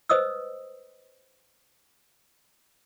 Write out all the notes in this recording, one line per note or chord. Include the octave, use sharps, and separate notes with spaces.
B4 C5 D#5 D#6 E6